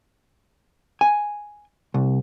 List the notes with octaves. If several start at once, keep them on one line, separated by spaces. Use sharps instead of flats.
G#5
C2